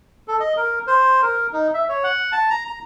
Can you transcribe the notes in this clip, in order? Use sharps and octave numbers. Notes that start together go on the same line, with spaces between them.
A4
D#5
A#4
C5
A#4
D#4
E5
C#5
F#5
A5
A#5
A#5